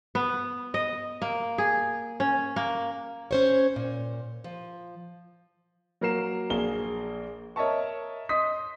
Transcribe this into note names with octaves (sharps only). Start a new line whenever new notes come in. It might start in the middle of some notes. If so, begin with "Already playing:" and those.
B3
D#5
A#3
G#4
C#4
A#3
C#4 C5 C#5
A#2
F3
F#3 A#3 A#4 A#5 C7 E7
A#1 A#3 G#4 G7
A#4 C#5 D#5 E5 A5 C#6
D#5 C6 D#6 B6